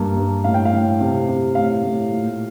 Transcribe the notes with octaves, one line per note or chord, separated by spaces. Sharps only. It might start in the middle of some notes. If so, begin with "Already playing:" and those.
Already playing: G2 A#3
G2
A2 F5
G5
F5
A2
C3
C3
A2 F5
A2
A#2